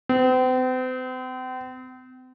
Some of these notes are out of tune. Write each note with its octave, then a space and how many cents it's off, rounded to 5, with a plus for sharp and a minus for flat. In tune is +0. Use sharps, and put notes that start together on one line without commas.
C4 -40